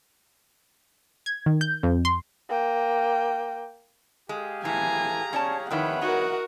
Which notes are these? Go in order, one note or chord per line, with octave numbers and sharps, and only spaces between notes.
G#6
D#3
G6
F2
C6
A#3 G5
G#3 G4 G#4 F5
A2 E3 G#5 A#5
C#4 C#5 D5 A5
F2 D#3 E4 G#4 B4 C#5 F#5 G5
D#4 F#4 A#4